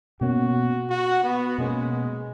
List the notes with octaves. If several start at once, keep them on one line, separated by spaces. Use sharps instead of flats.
B2 A#3 C#4 F#4
F#4
B3
B2 G#3 A#3 C#4